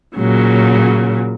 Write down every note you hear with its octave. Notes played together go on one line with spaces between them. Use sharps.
A#2 C#3 F#3